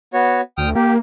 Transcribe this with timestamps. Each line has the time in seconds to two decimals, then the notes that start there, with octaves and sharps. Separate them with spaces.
0.14 B3 F#4 C#5
0.58 D2 G5 D#6 F6
0.75 A#3 G4